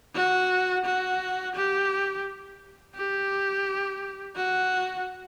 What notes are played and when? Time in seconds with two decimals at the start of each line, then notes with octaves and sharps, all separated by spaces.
0.15 F#4
0.85 F#4
1.55 G4
2.95 G4
4.36 F#4